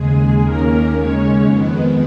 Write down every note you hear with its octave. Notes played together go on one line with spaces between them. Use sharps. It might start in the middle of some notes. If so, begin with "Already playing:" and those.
Already playing: D#2 C#3 G#3 G#4
D#2 D#3 A#3 C#4 A#4
D#2 C#3 G#3 C#4 C#5
F2 D#3 G#3 B3